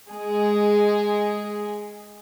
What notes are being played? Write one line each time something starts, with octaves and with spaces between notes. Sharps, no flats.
G#3 G#4